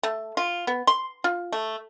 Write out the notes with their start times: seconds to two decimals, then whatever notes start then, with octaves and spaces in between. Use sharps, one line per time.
0.03 A3
0.37 F4
0.67 B3
0.87 C6
1.24 F4
1.52 A3